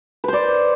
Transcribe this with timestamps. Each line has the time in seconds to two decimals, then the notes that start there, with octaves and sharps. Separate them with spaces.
0.24 B4
0.28 C5
0.33 D5